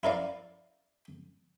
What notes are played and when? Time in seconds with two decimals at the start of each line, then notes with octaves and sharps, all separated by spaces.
0.03 E4 A#4 D5 F5